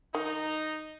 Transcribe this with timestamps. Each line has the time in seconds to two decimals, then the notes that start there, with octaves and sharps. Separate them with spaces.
0.15 D#3 D#4